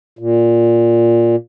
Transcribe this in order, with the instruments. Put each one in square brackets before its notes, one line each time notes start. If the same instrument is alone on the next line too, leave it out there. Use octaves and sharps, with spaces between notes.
[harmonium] A#2